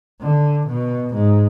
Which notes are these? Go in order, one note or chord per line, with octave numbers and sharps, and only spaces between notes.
D3
B2
G#2